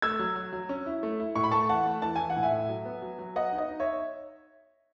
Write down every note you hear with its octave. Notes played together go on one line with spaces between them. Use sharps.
A3 E6 G#6
F#3
F#3
F#3
C#4
E4
A3
E4
A2 C#6
B5
A3 A5 C#6
E3 F#5 A5
A3
E3 A5
E3 G#5
F#5
A2
E5 G#5
A2
F#3
B3
F#3
F#3
B3 D#5 F#5
D#4
D#5
D#4
C#5 E5